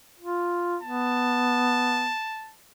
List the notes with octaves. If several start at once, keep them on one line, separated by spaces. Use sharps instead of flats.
F4
B3 A5